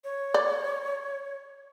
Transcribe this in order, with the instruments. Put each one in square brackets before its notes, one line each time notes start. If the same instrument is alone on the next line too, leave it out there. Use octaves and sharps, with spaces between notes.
[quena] C#5
[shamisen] D5